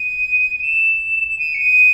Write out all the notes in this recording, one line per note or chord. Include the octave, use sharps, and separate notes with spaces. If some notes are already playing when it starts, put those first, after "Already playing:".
Already playing: D#7
D#7
E7
E7
D#7
C#7
D#7